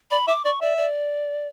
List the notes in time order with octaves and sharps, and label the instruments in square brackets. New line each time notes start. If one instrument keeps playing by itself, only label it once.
[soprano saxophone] D5 [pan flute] B5
[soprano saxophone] E5 [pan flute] D6
[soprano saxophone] D5 [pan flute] C#6
[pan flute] D5 [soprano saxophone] E5
[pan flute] D5